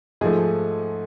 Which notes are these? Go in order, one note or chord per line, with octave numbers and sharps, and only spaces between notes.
G#2 F3 A3 G#4